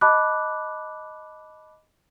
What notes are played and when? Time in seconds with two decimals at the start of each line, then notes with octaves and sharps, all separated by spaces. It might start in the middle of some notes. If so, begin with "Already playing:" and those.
0.01 D#5 A5 B5 D6 F#6